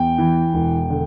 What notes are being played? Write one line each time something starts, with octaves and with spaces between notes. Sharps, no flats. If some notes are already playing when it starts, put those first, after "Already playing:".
Already playing: E2 G5
E3
E1
D3